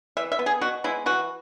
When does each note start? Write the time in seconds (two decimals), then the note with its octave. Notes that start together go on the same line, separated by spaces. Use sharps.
0.17 E3 E5
0.32 E5
0.39 B3
0.46 G#4
0.61 B2 F#4
0.84 G#3 B3 E4
1.06 E3 F#4